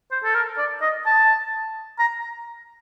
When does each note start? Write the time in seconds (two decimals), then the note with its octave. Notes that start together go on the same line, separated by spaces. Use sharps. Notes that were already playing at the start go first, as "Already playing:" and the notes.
0.12 C5
0.24 A4
0.35 A#4
0.58 D5
0.82 D#5
1.06 A5
1.99 A#5